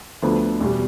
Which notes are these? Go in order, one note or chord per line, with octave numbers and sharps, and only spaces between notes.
D2 D3 F3 B3
E2 B2 G3